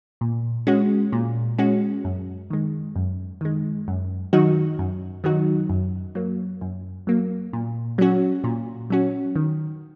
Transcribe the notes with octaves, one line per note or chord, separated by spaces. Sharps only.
A#2
G#3 C#4 F#4
A#2
G#3 C#4 F#4
F#2
D#3 G#3
F#2
D#3 G#3
F#2
D#3 F#3 D#4 F#4
F#2
D#3 F#3 D#4 F#4
F#2
F#3 A#3
F#2
F#3 A#3
A#2
F#3 C#4 F#4
A#2
F#3 C#4 F#4
D#3